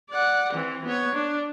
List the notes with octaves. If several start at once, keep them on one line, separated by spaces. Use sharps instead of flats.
D5 F#5
E3 C4
B3 C#5
D4